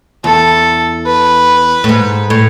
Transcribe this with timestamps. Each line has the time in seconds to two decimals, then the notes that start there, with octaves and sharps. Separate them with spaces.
0.24 E2 A4
1.06 B4
1.84 A2
1.89 G#2
2.30 A2